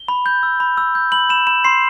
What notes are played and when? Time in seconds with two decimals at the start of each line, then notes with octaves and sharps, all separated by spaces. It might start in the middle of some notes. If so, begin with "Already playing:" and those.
Already playing: G7
0.08 B5
0.26 G6
0.43 E6
0.60 B5
0.77 E6
0.95 G6
1.12 B5 F#7
1.29 B5 E7
1.47 B5 E7
1.64 C6 C7